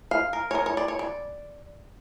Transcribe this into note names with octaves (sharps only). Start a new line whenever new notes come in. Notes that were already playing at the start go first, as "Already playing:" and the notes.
F5
A#4
C#5
A#4
C#5
D5
C#5
D5